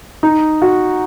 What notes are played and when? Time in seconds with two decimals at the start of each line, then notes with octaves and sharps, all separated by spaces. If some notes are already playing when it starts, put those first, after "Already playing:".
0.23 D#4
0.62 F#4